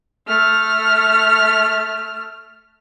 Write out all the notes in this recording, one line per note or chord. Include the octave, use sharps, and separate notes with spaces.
A3 F6